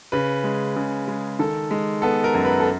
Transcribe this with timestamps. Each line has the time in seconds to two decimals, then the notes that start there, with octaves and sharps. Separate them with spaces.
0.12 C#3 B4
0.44 G#3
0.76 C#3
1.08 G#3
1.39 D#3 A4
1.71 G#3
2.02 B3 A4
2.24 A#4
2.34 F#2
2.45 B4
2.60 A4